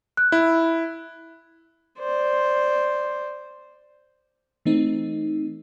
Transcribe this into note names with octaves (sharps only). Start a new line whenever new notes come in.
F#6
E4
C5 D5
E3 A3 C4 D#4